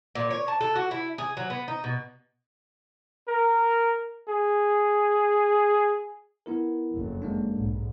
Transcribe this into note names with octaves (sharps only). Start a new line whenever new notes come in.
A#2
C#5
A5
A4
F#4
E4
G#4
F#3
B3
D#4
B2
A#4
G#4
B3 E4 A#4
F#1 F2
G#3 A#3 D4
B1 G#2